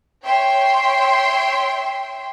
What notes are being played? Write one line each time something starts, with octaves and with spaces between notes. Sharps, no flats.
C#5 E5 G5 C6